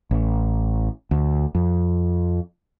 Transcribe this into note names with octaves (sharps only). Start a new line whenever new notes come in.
A1
D2
F2